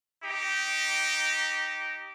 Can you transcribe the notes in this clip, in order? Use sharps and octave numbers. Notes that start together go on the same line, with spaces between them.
D#4 G4